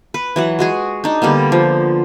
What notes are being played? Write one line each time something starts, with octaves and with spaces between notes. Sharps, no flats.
B4
E3 F#3 F#5
G#3 F#4 G#4
D4 D#4
D3 G3 A#3 B3
F3